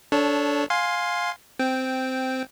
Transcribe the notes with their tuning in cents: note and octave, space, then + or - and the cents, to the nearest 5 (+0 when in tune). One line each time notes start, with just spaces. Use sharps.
D4 -20 A4 +0 C#5 +0
F5 +15 G#5 +0 C6 +0
C4 -10 G5 +0